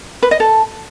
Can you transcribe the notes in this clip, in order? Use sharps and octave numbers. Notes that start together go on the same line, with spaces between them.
B4
D#5
A4